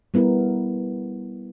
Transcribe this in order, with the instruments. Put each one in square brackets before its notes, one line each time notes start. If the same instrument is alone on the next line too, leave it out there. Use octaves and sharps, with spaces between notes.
[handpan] G3 B3 E4 A#4